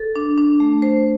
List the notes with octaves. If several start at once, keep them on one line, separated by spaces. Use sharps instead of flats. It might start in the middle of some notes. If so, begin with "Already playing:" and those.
Already playing: A4
D4
D4
A3
C5